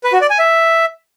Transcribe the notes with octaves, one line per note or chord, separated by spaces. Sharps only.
B4
F#4
D5
G#5
E5